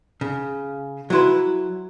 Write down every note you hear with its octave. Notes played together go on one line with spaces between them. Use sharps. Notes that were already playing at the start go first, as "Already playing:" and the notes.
C#3
F#3 E4 F#4 B4 C6